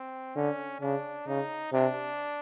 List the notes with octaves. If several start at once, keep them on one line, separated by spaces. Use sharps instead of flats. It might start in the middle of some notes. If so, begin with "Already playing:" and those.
Already playing: C4
D3 C#4
C#3 D4
C#3 D#4
C3 D4